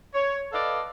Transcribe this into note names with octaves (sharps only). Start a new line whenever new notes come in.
C#5
A4 B4 D5 D#5 F5